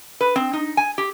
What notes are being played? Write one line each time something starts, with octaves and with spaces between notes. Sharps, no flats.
B4
C4
D#4
G#5
G4